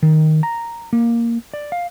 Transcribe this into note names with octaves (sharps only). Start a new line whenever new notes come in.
D#3
A#5
A#3
D5
F5